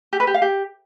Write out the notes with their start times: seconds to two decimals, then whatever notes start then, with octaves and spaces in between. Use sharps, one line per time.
0.13 G4
0.20 B4
0.27 G4
0.34 F5
0.42 G4